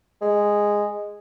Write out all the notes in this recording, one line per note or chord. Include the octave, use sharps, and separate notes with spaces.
G#3